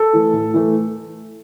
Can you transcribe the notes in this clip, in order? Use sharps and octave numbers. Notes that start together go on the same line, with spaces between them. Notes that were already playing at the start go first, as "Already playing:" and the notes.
Already playing: A4
E3 A3
A2
E3 A3